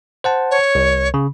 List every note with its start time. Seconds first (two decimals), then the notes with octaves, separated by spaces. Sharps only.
0.24 C5 F#5 A5
0.51 C#5
0.75 C2
1.14 C#3